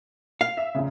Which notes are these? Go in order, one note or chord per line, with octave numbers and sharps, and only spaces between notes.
F5
E5
F1 C#3